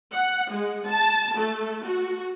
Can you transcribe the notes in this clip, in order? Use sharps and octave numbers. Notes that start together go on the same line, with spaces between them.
F#5
G#3
A5
A3
F#4